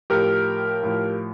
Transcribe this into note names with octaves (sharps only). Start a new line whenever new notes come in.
A2 F3 G4 A#4
A2 F3